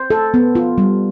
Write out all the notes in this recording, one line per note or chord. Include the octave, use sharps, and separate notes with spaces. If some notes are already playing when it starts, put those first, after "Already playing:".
Already playing: C5
A4
B3
F4
G3